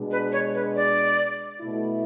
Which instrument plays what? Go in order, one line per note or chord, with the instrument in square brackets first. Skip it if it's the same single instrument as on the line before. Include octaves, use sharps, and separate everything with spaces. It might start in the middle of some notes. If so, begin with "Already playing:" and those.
Already playing: [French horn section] B2 G#3 D4
[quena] B4
C#5
B4
D5
[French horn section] B2 A3 E4